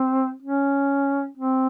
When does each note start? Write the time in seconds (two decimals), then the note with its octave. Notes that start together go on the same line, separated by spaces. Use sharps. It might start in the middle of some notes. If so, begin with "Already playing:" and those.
Already playing: C4
0.42 C#4
1.37 C4